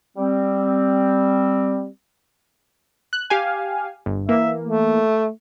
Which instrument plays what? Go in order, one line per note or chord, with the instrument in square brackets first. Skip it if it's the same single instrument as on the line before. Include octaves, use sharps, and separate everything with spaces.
[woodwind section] G3 C4
[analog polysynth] F#6
G4 F5 G#5
G1
[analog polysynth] E3 A#3 [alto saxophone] E5
[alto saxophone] A3